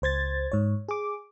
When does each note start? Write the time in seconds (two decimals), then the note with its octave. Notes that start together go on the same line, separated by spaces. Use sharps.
0.02 C#2 C5 G#6 A6
0.52 G#2 C#5
0.89 G#4 D6